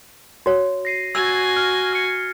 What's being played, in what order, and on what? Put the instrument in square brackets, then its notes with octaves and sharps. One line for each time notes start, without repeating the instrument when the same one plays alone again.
[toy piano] F#4 C#5
[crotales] A#6 C7 D#7
[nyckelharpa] F#4 G#5 [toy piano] E6 [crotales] G#6 A6
[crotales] F6
F6 C#7